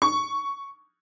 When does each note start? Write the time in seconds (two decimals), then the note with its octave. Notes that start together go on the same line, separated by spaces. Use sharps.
0.02 C#6